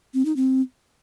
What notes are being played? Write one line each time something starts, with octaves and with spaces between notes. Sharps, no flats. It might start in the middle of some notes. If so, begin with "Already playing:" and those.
C4
D#4
C4